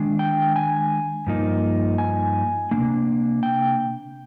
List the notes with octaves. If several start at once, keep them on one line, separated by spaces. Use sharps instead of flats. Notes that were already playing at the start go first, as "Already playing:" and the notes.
Already playing: D#3 G#3 D4
G5
G#5
G2 F3 A#3 D#4
G#5
C3 D#3 A#3 D4
G5